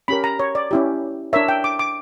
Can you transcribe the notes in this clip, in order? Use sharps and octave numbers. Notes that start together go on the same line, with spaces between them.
C#4 G4 A#4 B5
A#5
C#5
D5
C#4 E4 G4
D4 A#4 C#5 E5
G5
D6
D6